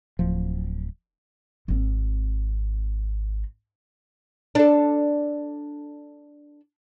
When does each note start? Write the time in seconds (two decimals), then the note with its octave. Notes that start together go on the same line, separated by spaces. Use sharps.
0.19 D1 F3
1.68 G#1 C4
4.55 D4 A4